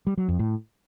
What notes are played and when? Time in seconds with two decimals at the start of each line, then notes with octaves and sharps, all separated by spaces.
0.07 G3
0.18 F#3
0.28 F2
0.39 A2